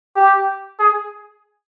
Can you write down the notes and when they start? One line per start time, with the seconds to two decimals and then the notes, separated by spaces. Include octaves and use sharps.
0.16 G4
0.79 G#4